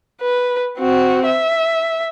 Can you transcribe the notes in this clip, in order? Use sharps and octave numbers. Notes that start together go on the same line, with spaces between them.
B4
C4 F#4
E5